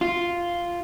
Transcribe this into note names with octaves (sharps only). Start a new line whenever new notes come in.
F4